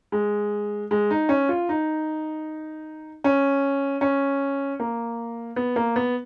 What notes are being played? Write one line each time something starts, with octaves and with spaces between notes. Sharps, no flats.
G#3
G#3
D#4
C#4
F4
D#4
C#4
C#4
A#3
B3
A#3
B3